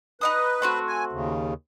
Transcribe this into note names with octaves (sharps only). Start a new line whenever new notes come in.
D#4 B4 D#5 D#6
A3 C4 F#4
G#5
D#2 C#3